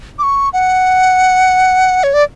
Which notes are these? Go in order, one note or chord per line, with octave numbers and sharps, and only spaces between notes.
D6
C#6
F#5
C#5
D5